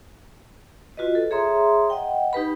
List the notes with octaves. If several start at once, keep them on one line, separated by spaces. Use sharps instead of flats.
F4 F#4 B4 D#5
A4
G#4 C#5 E5 A#5 C6 D#6
D#5 F#5 G5
D#4 G4 B4 B5